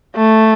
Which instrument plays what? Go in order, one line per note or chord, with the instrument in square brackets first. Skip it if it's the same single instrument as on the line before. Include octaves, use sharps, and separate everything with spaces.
[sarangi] A3